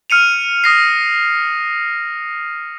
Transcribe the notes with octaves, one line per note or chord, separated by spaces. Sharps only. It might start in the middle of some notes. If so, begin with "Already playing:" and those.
F6 C#7 D#7 F7
D#6 A#6 C7